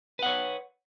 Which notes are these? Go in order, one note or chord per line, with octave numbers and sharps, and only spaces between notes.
B4 C#5 F#5